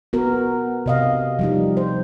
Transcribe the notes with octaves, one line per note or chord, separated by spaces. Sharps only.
B3 F#4 A#4
C3 D#5 F5
F3 G3 D#4
C5